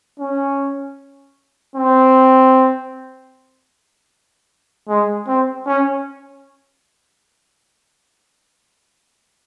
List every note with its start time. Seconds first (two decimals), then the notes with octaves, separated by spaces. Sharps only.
0.20 C#4
1.76 C4
4.88 G#3
5.27 C4
5.67 C#4